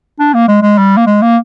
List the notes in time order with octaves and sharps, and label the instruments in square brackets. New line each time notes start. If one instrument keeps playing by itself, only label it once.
[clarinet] D4
A#3
G#3
G#3
G3
A#3
G#3
A#3